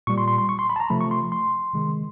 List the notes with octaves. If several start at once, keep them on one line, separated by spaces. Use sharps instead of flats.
A#2 G3 C#6
C6
C6
C6
C#6
C6
B5
A5
A#5
C3 F3 A3 B5
C#6
C6
C6
C3 D#3 G#3